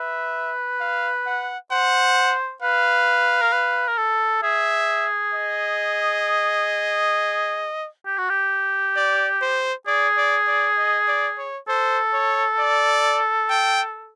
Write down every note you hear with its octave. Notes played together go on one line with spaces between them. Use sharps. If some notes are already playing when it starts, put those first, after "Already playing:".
Already playing: B4 E5
F5
F#5
C5 F#5
B4 F5
A#4
B4
A#4
A4
G#4 E5
D#5
G4
F#4
G4
D5
C5
G#4 D5
D5
D5
D#5
D5
C#5
A4 C5
C#5
D5
G5